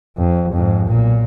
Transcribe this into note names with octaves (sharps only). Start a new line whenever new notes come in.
F2
F2 G#2
B1 A#2